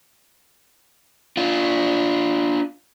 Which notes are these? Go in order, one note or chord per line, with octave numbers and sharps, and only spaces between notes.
D4 F4